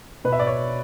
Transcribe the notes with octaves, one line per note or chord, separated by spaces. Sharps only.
B2 B4
E5
D5
C#5